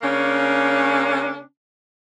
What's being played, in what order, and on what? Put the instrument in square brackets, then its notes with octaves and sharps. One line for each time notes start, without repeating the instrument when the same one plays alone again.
[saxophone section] C#3 A#3 C#4 D4